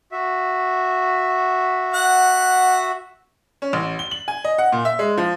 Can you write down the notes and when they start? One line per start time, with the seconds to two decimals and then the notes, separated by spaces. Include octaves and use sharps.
0.12 F#4 E5
1.94 F#5
3.62 C#4
3.73 A1
3.99 G7
4.11 F#7
4.28 G#5
4.45 D#5
4.58 F#5
4.72 A#2
4.85 E5
4.99 G#3
5.17 F3